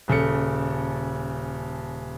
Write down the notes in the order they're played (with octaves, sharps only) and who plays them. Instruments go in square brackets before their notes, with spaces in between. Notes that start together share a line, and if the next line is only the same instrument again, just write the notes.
[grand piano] D#1 C#3 A4 C#7